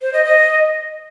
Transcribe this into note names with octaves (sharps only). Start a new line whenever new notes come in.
C5
D#5
D#5